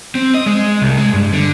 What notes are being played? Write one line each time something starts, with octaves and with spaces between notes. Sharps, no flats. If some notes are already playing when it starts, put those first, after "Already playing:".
C4
D#5
G#3
C2
G#3
G2
D3